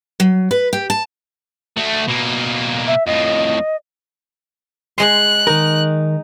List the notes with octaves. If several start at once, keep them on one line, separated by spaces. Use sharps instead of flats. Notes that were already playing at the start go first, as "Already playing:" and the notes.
F#3
B4
G4
A5
A3 F#4
B2 A#3
E5
F2 A2 D#5
G#3 C6 F#6
D#3 D#4 A#4